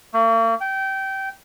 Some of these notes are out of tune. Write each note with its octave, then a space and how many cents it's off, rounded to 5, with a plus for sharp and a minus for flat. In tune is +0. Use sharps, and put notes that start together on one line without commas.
A#3 -45
G5 -20